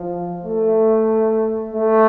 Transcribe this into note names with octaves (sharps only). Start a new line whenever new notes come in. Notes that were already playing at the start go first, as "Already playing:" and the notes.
Already playing: F3
A3
A3